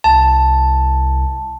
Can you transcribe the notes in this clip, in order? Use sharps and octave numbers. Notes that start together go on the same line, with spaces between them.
C2 A5